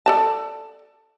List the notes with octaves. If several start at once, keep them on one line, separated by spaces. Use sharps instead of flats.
A4 D5 A5